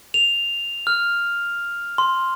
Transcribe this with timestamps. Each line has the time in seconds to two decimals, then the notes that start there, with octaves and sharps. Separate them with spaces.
0.14 F7
0.87 F6
1.98 C6